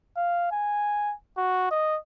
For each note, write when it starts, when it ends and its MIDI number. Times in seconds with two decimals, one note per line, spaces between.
0.17 0.51 77
0.52 1.14 80
1.37 1.67 66
1.71 1.97 75